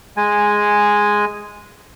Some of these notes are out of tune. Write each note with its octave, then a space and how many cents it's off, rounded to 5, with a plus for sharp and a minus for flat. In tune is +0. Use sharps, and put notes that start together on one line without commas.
G#3 +0 G#5 -5